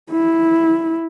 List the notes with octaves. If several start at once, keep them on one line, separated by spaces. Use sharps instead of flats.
E4